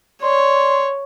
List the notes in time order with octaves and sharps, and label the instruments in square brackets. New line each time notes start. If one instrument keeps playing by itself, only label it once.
[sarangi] C#5 [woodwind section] D5 C6